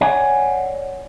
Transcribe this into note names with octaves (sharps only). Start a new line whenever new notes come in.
C#5 D5 F#5 G#5